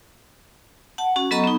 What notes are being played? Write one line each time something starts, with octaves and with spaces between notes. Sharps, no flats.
F#5 A5
C#4 F#4
F#3 B3 A4 D#5 A#5 C#6
B3 D#4